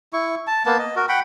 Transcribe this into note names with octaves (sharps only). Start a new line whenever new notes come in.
E4 C#6
A5
A#3 B3 A5
D#5
F#4 A#4
F#5 G5 B5